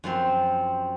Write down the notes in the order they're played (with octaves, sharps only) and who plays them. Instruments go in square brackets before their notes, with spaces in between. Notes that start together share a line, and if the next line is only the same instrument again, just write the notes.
[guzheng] F#2 F3 C4